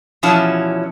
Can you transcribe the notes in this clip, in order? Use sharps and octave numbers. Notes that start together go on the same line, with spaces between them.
E2 B2 F3 C#4 E4 A5